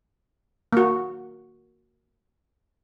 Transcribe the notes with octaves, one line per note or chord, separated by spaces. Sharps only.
A#3 F#4